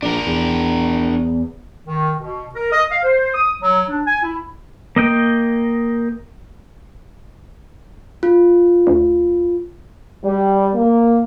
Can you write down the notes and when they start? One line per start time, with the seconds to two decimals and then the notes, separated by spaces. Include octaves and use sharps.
0.02 A#1 D4 A#4
0.27 E2
1.85 D#3
2.17 B2
2.54 A#4
2.72 D#5
2.91 F5
3.02 C5
3.34 D#6
3.61 F#3
3.88 D4
4.06 G#5
4.22 E4
4.96 A#3 D#5 G5
8.23 F4
8.87 D2
10.24 G3
10.75 A#3